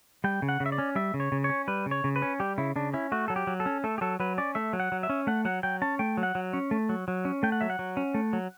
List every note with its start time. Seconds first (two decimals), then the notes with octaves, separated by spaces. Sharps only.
0.24 G3 G5
0.42 C#3
0.49 F#5
0.60 C#3
0.66 E5
0.72 D5
0.78 C#4
0.95 G3 E5
1.14 C#3
1.20 C#5
1.32 C#3
1.44 C#5
1.49 C#4
1.68 G3 B4
1.86 C#3
1.91 C#5
2.04 C#3
2.16 B4
2.22 C#4
2.40 G3 G4
2.58 C#3 E4
2.76 C#3 D4
2.94 C#4 E4
3.12 A3 F#4
3.28 F#3 A4
3.36 G4
3.47 F#3
3.60 A4
3.66 C#4
3.84 A3 A4
3.98 G4
4.01 F#3 A4
4.20 F#3 B4
4.38 C#4 D5
4.55 A3 E5
4.73 F#3
4.80 F#5
4.92 F#3
5.03 E5
5.09 C#4
5.27 A3 F#5
5.45 F#3 F#5
5.63 F#3 G5
5.82 C#4 A5
5.99 A3 G5
6.17 F#3
6.23 F#5
6.35 F#3
6.53 C#4
6.71 A3
6.89 F#3
7.08 F#3
7.25 C#4
7.43 A3 G5
7.52 F#5
7.61 F#3 E5
7.70 F#5
7.79 F#3
7.97 C#4
8.14 A3
8.33 F#3